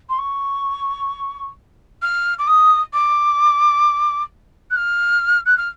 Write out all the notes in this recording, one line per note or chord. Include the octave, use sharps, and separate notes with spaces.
C6
C#6
F6
D6
D#6
D6
F#6
F6
F#6
F6